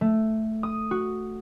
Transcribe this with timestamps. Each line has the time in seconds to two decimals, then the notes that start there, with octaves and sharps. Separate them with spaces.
0.01 A3
0.63 D#6
0.91 F#4